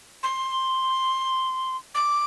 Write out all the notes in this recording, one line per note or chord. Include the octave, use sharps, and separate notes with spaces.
C6
D6